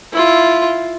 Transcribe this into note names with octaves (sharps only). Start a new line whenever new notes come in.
E4 F4